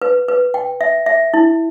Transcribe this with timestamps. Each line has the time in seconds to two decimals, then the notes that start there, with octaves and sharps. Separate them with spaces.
0.02 B4
0.28 B4
0.54 G5
0.81 E5
1.06 E5
1.34 E4